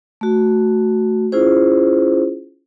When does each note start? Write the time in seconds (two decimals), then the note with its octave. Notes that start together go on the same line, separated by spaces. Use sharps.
0.21 A3 F#4
1.32 C#4 E4 F4 G#4 C5